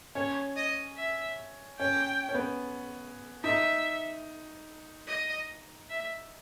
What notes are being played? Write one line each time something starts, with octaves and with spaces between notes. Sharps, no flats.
C#4 C#5
D#5
E5
C#4 G5
C#4
B3
D#4 E5
D#5
E5